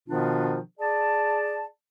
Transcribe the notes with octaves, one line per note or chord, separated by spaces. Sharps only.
B2 D#3 F3 B3 D4 F4
G#4 D5 A5